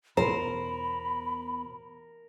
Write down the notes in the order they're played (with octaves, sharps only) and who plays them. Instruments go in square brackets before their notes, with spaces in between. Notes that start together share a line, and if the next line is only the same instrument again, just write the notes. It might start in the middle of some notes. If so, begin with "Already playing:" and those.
[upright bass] E2 B2 [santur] A#4 [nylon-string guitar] C5 [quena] B5